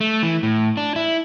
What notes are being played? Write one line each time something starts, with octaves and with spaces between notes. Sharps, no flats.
A3
E3
A2
D4
E4